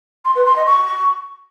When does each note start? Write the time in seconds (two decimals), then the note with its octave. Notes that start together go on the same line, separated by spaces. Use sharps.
0.25 C6
0.35 B4
0.46 C6
0.56 D#5
0.66 C#6